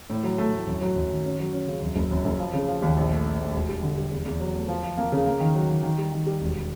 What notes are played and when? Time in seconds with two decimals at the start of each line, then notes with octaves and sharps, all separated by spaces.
0.10 A2
0.23 F#3
0.38 A3
0.52 A2
0.67 F#2
0.81 F#3
0.96 F#2
1.11 D#3
1.25 C#4
1.39 F#3
1.53 C#4
1.67 C#3
1.82 F#2
1.96 F#1
2.11 F#2
2.25 F#1
2.39 F3
2.53 C#3
2.68 F3
2.82 D#2
2.97 A#1
3.11 A3
3.25 A3
3.40 A3
3.54 E1
3.69 G3
3.82 D3
3.97 G3
4.11 E2
4.26 E2
4.40 F#3
4.55 A3
4.68 F3
4.83 F3
4.97 A#3
5.12 C#3
5.26 A#3
5.40 D#3
5.55 F#3
5.69 D#3
5.83 D#3
5.98 G3
6.12 D#3
6.26 G3
6.41 E1